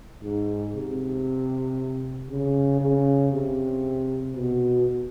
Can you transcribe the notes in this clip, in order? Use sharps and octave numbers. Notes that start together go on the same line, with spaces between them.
G#2
C3
C#3
C#3
C3
B2